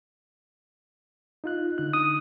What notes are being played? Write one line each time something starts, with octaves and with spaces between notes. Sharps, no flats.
D#4 F4 F#6
D3 D#4 F#6
D#6